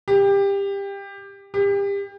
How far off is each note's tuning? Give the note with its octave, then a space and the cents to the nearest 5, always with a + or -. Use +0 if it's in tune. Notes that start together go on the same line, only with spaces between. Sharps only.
G4 +20
G4 +30